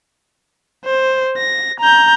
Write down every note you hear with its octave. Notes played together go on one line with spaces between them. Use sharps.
C5
A#6
A#5 G6